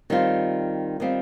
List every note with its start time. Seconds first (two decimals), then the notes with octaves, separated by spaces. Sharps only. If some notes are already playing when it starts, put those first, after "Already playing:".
0.10 D#3 G3 C4 F4
1.00 D#3 G3 C4 F4